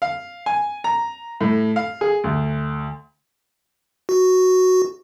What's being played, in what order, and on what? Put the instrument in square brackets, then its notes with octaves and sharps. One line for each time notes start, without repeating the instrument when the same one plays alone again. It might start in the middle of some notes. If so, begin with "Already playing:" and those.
[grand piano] F5
G#5
A#5
A2
F5
G#4
D2
[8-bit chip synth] F#4